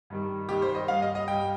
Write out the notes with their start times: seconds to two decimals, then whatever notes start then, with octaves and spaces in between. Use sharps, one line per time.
0.10 G2 D#3 G3
0.49 G2 D#3 G3 G4
0.62 C5
0.75 D#5
0.88 G2 G3 F5
1.02 D#5
1.15 D#5
1.28 G2 G3 G5